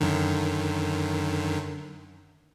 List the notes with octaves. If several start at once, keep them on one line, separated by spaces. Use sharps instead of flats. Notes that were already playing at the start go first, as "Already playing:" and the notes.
F#2 D3 D#3